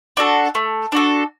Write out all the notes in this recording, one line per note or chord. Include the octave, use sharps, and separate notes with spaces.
D4 F#4 A4
A3
D4 F#4 A4